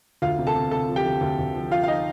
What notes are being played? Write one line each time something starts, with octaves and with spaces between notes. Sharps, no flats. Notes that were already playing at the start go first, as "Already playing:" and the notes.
D2 F4 F5
C3
A4 A5
C3
C3 A4 A5
F3
G4 G5
D2
D2
D2
F3
F3 F4 F5
F5
F3 D#4 D#5